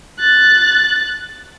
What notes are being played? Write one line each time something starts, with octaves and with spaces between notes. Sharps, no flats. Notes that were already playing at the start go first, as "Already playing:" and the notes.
F#6 A6